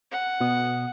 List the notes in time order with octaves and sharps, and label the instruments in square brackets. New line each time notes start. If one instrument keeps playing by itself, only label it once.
[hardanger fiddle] F#5
[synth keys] B2 B3 D#6